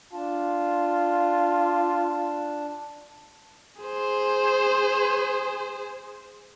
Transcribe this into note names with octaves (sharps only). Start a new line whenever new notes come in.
D4 F4 A5
G#4 C5